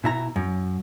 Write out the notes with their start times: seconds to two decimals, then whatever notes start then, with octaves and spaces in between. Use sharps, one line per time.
0.04 B2 E4 A#5
0.36 F#2